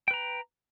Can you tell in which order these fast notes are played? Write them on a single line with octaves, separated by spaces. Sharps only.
G5 B4 A#5